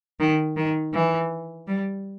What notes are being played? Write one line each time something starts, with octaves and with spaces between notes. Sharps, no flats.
D#3
D#3
E3
G3